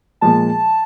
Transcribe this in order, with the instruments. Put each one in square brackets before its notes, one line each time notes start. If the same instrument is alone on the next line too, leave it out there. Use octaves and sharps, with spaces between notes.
[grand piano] A#2 F3 G#3 [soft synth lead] A5